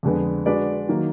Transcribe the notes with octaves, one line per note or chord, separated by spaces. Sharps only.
F2 D3 G#3 B3
G#3 D4 F#4 B4 D5
D#3 F#3 A#3 D#4